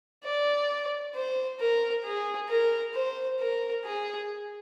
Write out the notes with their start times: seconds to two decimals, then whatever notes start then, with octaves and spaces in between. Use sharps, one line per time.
0.24 D5
1.14 C5
1.60 A#4
2.05 G#4
2.49 A#4
2.95 C5
3.40 A#4
3.85 G#4